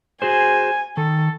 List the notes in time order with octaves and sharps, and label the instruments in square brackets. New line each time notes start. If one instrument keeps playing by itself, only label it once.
[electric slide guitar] F#4 G#4 C5 [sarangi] G#5
[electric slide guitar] D#3 [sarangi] A4